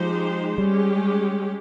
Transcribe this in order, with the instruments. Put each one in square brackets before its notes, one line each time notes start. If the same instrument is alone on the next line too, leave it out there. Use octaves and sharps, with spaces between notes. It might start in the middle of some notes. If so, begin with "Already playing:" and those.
Already playing: [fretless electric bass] F3 [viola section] G#3 D#4 G4 C5
[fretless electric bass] G3 [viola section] G#3 C#4 G4